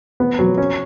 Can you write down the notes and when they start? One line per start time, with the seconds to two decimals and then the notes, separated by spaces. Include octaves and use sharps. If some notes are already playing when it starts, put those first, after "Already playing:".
0.20 B3
0.39 F#3
0.58 C#4